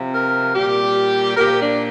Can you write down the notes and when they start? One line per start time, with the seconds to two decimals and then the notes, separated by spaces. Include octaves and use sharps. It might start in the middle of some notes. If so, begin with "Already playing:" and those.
Already playing: C3 F3
0.13 A#4
0.55 A#2 G3 G4
1.37 A#4
1.41 A#2 F3 G4
1.62 D4